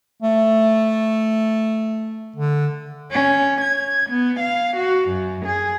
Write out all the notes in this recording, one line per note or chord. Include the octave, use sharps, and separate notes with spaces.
A3
D3
C#4
G#6
B3
F5
F#4
F#2
G#4